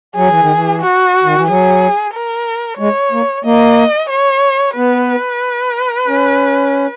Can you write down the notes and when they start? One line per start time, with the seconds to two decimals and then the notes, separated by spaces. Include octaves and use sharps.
0.16 F#3 G#4
0.28 E3
0.40 D#3
0.53 E3
0.81 F#4
1.23 D#3
1.35 E3
1.47 F#3 G#4
2.13 A#4
2.79 G#3 C#5
3.11 A#3
3.44 A#3 D#5
4.10 C#5
4.76 B3 B4
6.08 C#4